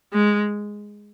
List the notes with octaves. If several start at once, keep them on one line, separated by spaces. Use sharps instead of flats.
G#3